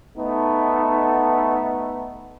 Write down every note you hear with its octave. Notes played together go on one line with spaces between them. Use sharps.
A3 B3 D#4